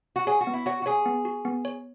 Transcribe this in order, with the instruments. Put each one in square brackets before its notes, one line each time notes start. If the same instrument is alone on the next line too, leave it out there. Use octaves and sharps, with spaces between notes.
[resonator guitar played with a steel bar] F#4
[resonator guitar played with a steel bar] G#4 [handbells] C#5
[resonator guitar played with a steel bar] F#4
[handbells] B3
[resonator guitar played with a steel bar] E4
[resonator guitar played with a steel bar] F#4 [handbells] C#5
[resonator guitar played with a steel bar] F#4
[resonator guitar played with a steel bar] G#4 [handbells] C#5
[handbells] B3
F#4
B3
C#5